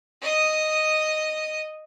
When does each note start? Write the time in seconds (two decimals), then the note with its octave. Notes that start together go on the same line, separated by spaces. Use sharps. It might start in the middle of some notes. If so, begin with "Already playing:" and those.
0.21 D#5 D#6